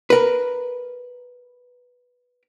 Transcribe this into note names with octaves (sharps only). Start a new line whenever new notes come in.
A#4 B4